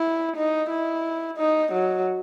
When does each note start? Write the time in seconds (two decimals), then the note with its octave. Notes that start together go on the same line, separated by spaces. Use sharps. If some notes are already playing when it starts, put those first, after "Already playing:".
Already playing: E4
0.36 D#4
0.70 E4
1.38 D#4
1.72 F#3